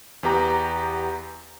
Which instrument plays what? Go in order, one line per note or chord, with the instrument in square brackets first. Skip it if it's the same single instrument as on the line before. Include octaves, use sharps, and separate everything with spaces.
[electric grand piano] E2 B3 G4 A#5